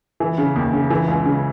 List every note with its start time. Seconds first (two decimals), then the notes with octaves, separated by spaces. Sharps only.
0.20 E3
0.38 C#3
0.56 D#2
0.73 C#3
0.90 E3
1.08 C#2
1.25 C#3